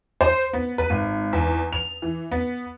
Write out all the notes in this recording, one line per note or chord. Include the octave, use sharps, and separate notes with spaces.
C5
B3
B4
G#1
E2
F7
E3
B3